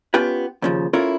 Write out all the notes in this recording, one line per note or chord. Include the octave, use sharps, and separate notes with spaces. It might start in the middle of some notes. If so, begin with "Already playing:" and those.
B3 C#4 F4 G4 B4
D#2 C#3 F3
C#4 E4 F4 A4 A#4